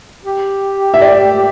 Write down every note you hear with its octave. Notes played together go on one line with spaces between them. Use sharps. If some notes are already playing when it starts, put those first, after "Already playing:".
G4
E5
D5